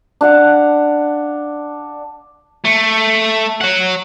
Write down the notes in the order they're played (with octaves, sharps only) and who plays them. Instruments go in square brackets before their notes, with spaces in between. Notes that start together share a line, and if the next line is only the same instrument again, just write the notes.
[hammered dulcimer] D4 F5 F#5
[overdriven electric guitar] A3
C#5 F#5